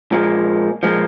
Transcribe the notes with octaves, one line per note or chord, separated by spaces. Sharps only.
A#2 F3 G#3
A#2 F3 G#3